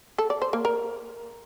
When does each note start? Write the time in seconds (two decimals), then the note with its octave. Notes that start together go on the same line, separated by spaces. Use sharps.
0.18 A4
0.30 D5
0.42 C5
0.53 A#3
0.65 A#4